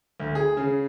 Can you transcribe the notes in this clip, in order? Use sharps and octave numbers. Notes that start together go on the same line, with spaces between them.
D2
G#4
C#3